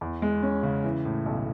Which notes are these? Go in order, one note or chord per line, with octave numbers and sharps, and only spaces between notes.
E2
G#3
C#4
C#3
E3
A2
B1